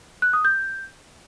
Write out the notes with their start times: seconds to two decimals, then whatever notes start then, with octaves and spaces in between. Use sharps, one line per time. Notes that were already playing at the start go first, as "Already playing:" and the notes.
0.22 F#6
0.33 D#6
0.45 G6